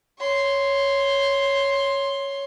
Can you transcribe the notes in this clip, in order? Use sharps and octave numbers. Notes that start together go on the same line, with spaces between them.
C#5 C6